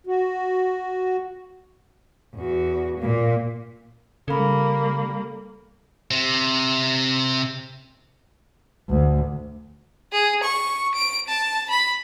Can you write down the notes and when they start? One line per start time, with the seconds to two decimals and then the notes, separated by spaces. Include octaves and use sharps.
0.07 F#4
2.36 E2 F#4
2.99 A#2 A#3
4.28 C#3 G3 A#3 A4 B5
6.11 C3
8.89 D2
10.12 G#4
10.43 C#6
10.95 D7
11.28 A5
11.70 B5